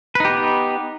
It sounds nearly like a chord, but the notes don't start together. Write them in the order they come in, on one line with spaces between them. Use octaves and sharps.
B4 D#4 G4 B3